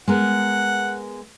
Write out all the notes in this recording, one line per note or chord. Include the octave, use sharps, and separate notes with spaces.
G#3 B3 A#4 F#5